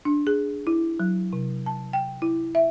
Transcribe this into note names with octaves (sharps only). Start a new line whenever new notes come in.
D4
G#4
E4
F#3
C3
A5
G5
E4
E5